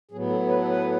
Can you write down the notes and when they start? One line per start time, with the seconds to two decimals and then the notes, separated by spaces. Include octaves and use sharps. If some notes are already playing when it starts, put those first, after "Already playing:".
0.11 A2 F#3 B3 G#4
0.30 A4
0.49 B4
0.58 A4
0.68 B4